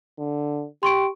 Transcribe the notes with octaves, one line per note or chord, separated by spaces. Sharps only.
D3
G4 C6 C#6 D7